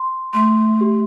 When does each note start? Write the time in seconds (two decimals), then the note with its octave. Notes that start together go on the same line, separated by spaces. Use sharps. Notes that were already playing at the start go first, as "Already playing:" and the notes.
Already playing: C6
0.33 A3 C6
0.81 G4